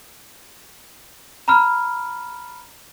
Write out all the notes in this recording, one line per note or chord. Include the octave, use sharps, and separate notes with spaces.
A#5 B5 F6